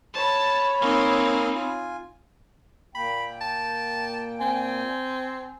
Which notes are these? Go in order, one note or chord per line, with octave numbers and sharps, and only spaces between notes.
C#5 A5 B5
A#3 C4 D#4 G#5 F6
F4 G#5
A#2 A#3 G5 B5
A5
C4 G#5